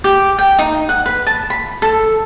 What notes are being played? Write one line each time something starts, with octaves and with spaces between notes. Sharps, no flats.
G4
G5
D#4
F#5
B4
A5
B5
A4